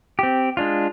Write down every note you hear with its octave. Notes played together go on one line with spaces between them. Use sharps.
C4 G4
G#3 D4 F4